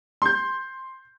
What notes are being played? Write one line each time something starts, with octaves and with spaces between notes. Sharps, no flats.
C6 G6